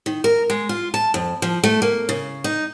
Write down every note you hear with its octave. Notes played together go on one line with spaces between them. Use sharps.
D#3
A#4
G#3
F4
A5
F2
F3
A3
A#3
C#3
D#4